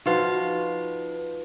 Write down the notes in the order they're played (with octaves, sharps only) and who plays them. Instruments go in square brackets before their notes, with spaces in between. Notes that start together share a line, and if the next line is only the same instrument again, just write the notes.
[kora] F3 F4 F#4 [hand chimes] D#4 B4